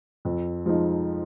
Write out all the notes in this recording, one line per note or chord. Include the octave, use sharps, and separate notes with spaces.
F2
F3 G#3 D#4